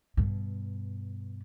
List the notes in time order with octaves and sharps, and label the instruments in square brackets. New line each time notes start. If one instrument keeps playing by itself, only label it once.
[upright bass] G2 B2